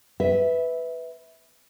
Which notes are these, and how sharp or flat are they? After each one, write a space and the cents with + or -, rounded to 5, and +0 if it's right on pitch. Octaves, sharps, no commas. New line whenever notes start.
B4 +5 E5 -15